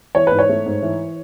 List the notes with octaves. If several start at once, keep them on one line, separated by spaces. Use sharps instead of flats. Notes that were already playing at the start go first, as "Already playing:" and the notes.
E3 C#5
G#2 B4
C#5
A3
G#2
E3